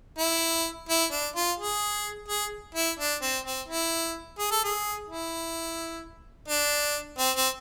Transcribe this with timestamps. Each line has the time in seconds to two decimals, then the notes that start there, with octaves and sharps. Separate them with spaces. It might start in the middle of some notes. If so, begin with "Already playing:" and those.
0.18 E4
0.89 E4
1.12 D4
1.36 F4
1.59 G#4
2.28 G#4
2.75 E4
2.99 D4
3.22 C4
3.45 C4
3.68 E4
4.39 G#4
4.51 A4
4.64 G#4
5.08 E4
6.48 D4
7.19 C4
7.36 C4